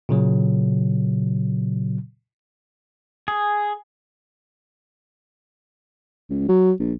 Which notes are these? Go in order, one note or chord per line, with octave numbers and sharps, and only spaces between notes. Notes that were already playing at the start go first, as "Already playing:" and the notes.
A#2 C#3 F#3
G#4
C#2
F#3
A#1